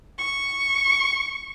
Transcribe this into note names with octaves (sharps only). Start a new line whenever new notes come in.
C#6